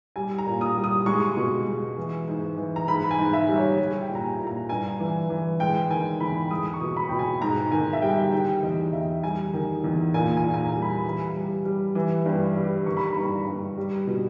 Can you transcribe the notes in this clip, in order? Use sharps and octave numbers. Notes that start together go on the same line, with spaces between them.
G3 G#5
A#5
A#2
D#6
G3
D#6
G#3 C#6
B2
G#3
E3
G#2
E3
A#5
G#2 B5
G#5
G#2
E5
G3
C#5
G3
G5
A#2
A#5
G#5
A#2
A#5
G2 G#5
E3
E3
G#3 G5
D#3 G#5
E2 B5
G#3 D#6
C#6
B2
B5
B2 G5
G#5
G#2 A#5
D#3 G#5
E5
G3 G5
D#3 G5
E2 D#5
E2 E5
G3 G#5
D#3
E2
A#2 G#5
G#5
A#2
G#5
A#5
G3
B5
E3
G3
G3
E3
G2
G3
D#3 C#6
B5
A#5
G2 B5
G2
G3
B2